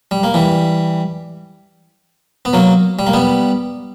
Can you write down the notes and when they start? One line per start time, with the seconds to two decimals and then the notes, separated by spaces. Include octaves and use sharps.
0.11 G3
0.23 A#3
0.34 E3 G3
2.45 B3
2.53 F#3 A#3
2.99 G3
3.07 A#3
3.13 G3 B3